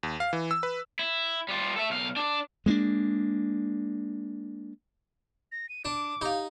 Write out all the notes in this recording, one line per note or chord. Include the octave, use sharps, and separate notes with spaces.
D#2
F5
E3
E6
B4
E4
G3 F4
A4 E5
B1 F5
D4 D5
G#3 A#3 C#4 D4
A#6
D#7
D4 D6
D#4 G4 F5